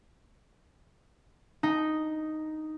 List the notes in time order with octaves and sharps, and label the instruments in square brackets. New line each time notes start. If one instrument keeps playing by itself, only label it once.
[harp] D#4